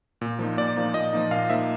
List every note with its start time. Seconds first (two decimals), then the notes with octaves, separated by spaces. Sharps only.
0.21 A#2
0.39 F3 A#3 D#4
0.57 A#2 D5
0.76 F3 A#3 D#4
0.94 A#2 D#5
1.13 F3 A#3 D#4
1.31 A#2 F5
1.49 F3 A#3 D#4 E5